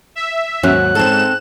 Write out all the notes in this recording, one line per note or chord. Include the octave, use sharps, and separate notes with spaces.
E5
D#2 G#2 F#3 C#4 F#6
G#2 C4 A4 E7